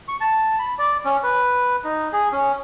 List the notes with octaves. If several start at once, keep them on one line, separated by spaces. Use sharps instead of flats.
C#6
A5
B5
D5
C#4
B4
D#4
G#4
C#4